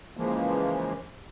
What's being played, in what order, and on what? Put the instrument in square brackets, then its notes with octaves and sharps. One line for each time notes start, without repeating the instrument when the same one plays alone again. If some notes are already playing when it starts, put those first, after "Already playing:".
[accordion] C#3 E3 F3 G#3 A#3